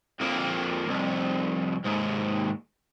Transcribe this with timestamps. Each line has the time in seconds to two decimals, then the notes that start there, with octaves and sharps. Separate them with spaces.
0.20 F2 A#3
0.88 C2 F2
1.85 D#2 G#2